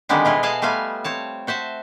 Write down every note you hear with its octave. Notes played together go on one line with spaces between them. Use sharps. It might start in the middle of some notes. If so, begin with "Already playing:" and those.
D3 D#3 G3 G#3 B3 C4
B2 E4 F4 D#5
G#4 A4 D#5 F5 G#5 A5
G3 A3 B3 F4 F5 G#5
C4 C#5 A5
F#4 C5 E5 A5